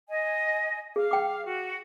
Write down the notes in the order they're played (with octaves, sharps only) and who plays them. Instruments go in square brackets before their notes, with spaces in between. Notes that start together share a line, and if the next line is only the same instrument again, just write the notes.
[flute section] D#5 G#5
[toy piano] G#4 [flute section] F5
[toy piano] G5 D6
[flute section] F#4